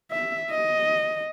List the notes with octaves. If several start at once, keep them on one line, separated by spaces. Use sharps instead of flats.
E5
D#5